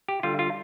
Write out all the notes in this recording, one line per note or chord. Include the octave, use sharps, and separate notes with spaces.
G4
D3 G3 F4
F4